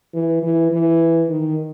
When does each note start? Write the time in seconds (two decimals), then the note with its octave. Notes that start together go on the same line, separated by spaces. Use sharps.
0.14 E3
0.42 E3
0.71 E3
1.29 D#3